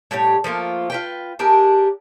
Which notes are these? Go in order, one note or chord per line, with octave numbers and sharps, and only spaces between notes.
A2 G3 G4 C#5
F3 A3 A#3 F4
F4 B4 G5
D4 G4 G#4 A#4